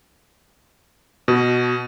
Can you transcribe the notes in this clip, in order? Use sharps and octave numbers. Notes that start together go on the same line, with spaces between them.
B2